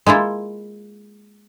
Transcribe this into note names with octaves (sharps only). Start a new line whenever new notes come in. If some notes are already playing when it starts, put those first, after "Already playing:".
G#3 A#3 E4 F4